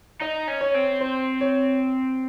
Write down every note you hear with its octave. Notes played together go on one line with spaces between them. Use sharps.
D#4 D#5
C#4
C#5
C4
C5
C#5